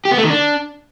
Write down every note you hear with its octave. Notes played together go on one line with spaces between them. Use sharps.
G4
B3
A3
D#3
D4